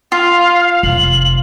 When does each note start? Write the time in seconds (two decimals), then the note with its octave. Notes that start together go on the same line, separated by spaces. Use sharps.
0.12 F4 F5
0.83 F1 F#7